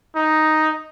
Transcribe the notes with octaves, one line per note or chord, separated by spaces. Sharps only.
D#4